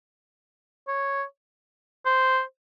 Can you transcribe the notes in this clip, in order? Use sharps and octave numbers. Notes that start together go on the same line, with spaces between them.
C#5
C5